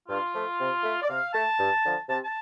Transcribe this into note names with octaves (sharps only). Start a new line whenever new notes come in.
G2 F4
F3 A3
C3
A3
D5
C3 F5
A3 A5
G2
D3 F3
C3 A5
A5